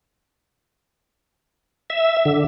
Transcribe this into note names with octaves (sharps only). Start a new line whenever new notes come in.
E5
D3